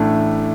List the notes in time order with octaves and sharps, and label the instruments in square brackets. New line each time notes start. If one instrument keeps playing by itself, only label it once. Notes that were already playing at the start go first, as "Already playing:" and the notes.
Already playing: [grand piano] A1 A2 A3 D4